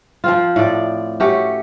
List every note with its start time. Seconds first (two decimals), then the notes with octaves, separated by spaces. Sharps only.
0.24 F3 C4 F4
0.56 A2 D5
1.20 A3 C#4 F#4 G4